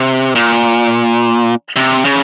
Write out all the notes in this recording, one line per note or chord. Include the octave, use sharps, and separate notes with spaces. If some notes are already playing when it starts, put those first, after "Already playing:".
Already playing: C3
A#2
C3
C#3